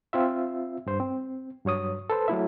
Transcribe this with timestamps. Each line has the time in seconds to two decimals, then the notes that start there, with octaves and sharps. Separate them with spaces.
0.13 C4 F4 E5
0.87 G2 C5
1.00 C4
1.65 G2 F#3 C#5 D#6
2.10 A4 B4 C5
2.28 F#3 A3 E4 E5